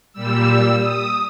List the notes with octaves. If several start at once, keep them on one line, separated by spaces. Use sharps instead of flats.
A#2 G3 E6
D#6